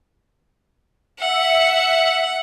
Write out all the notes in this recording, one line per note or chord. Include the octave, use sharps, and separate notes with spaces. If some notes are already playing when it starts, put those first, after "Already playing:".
E5 F#5 C#7